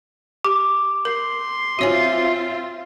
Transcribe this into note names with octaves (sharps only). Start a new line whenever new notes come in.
G4 D6
A#4 C6
C4 F4 F#4 C#5 E5 G#5